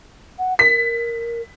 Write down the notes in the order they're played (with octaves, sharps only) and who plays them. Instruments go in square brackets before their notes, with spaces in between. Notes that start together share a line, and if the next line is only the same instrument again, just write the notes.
[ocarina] F#5
[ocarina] A#4 [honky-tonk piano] B6